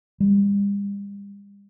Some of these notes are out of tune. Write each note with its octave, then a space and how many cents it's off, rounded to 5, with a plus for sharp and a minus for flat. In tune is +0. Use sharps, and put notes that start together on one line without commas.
G3 +40